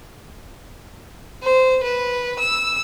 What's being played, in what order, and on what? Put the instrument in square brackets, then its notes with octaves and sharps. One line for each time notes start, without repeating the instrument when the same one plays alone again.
[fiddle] C5
B4
E6